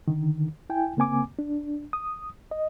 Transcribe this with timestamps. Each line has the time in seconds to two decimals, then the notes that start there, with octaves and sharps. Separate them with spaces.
0.08 D3 D#3
0.70 E4 G5 G#5
0.97 C#3 A#3 C4 G#5 D6
1.39 D4
1.93 D#6
2.51 D#5